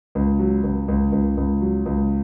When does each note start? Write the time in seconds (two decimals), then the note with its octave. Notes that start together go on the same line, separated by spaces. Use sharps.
0.15 C#2
0.39 F#3
0.63 C#2
0.88 C#2
1.12 C#2
1.37 C#2
1.62 F#3
1.86 C#2